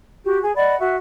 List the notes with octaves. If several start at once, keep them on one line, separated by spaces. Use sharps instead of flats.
F#4 G4
G#4
D5 D#5 F#5 B5
F#4 E5